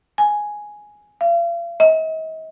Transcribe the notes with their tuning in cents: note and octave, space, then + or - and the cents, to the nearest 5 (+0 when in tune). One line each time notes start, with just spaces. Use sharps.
G#5 +5
F5 -40
D#5 +40